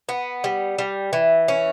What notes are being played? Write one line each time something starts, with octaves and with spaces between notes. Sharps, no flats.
B3
G3
G3
E3
C#4